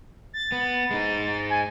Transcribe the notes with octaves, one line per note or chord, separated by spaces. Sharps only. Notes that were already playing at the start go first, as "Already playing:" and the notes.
A6
B3
G#3 D#4
G#5